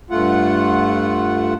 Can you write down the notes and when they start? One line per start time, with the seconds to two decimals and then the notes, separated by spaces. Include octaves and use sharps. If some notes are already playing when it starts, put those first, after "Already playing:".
0.11 G2 A3 F4 F#5